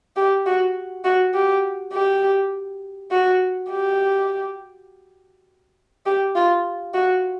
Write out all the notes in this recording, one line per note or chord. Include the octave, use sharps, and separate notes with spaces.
G4
F#4
F#4
G4
G4
F#4
G4
G4
F4
F#4